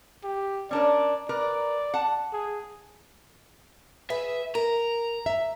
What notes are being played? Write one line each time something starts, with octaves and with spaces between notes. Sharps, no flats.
G4
C#4 D4 A#4 D5
A#4 B4 D5
F#5 A5
G#4
G#4 B4 E5
A#4 A#5
E5